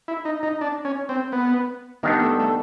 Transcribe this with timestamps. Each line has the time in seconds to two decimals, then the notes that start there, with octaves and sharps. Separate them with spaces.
0.08 E4
0.25 D#4
0.43 D#4
0.61 D4
0.85 C#4
1.09 C4
1.32 B3
2.03 D#3 G3 A#3 B3 D4
2.22 A3
2.40 A3